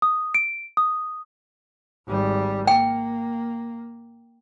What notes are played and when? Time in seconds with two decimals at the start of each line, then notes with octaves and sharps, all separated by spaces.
0.02 D#6
0.35 D7
0.77 D#6
2.08 G#1 G3
2.67 A#3 G5